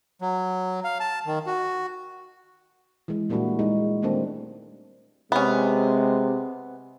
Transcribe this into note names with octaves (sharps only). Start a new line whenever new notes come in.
F#3
F5
A5
D#3
F#4
E3 G#3
A#2 G3 A#3 D4 E4 F#4
G#3 D#4
D#3 G3 A3 A#3 C4 D4
C3 G#3 B3 C#4